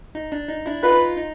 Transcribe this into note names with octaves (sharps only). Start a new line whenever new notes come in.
D#4
D4
D#4
D4 E4
D#4 F4 B4
D#4